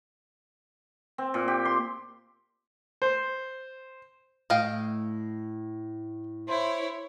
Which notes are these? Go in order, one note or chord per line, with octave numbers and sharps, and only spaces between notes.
C4
A#2
G4
C6
C5
A2 D#5 F5 G5
E4 C5 C#5